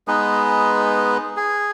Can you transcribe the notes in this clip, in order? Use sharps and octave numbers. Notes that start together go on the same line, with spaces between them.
G#3 B3 D#4 B4
G#4